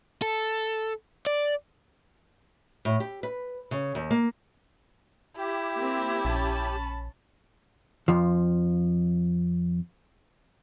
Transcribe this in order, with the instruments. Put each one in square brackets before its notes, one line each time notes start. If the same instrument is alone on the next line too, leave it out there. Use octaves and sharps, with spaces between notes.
[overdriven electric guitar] A4
D5
[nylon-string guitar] A2
G4
B4
C#3
D#2
A#3
[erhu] E4 [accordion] G4
[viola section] A#3 C4
[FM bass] A#1 [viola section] C#4 A5 B5
[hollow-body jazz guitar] F2 F3